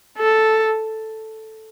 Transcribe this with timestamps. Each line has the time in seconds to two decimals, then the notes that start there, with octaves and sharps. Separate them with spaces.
0.18 A4